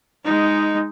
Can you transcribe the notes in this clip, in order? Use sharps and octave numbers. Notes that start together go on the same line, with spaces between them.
G#3 D#4